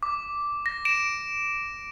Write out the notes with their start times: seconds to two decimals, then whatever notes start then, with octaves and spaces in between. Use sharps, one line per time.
0.03 D6
0.66 A#6
0.85 D7 E7